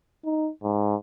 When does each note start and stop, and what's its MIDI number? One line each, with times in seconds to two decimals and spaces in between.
0.25 0.50 63
0.63 0.95 44